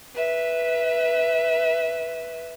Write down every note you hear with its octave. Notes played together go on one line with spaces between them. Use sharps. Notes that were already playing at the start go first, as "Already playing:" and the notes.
B4 E5